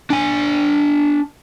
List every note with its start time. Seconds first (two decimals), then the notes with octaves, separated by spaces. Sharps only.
0.10 D4 G#5